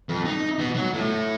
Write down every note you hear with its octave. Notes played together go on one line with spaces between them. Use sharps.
F2
D#4
B2
F#3
A2